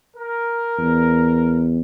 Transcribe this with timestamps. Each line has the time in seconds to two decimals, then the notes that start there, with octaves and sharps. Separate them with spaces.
0.15 A#4
0.78 E2